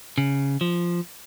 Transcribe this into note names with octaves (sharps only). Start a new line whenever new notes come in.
C#3
F3